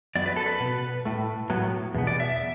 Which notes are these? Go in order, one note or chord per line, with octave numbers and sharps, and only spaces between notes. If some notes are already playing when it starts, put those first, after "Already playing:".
F#2 F#3 B3 D5
B4
A4
B4
B2 B3
A2 A3
A2 F#3 B3
E2 B2 B3
D5
E5